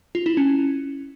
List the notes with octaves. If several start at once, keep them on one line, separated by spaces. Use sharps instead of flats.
F4
E4
C#4